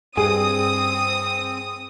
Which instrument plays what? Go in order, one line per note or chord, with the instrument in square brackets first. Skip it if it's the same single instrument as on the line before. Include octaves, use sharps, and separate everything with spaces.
[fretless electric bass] G2 [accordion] C4 [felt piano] G#4 [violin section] D#6